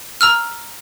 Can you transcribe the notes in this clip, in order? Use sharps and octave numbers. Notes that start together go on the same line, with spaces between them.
A#5 E6 F6